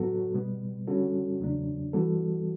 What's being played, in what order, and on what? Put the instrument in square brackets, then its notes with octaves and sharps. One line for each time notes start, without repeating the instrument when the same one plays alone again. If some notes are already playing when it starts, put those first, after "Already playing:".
Already playing: [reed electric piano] A2 F#3 B3 F#4 A4
B2 G3 B3
D3 G3 C#4 F#4 A4
E2 C#3 F#3 A3 D4
E3 G3 B3 F#4 A4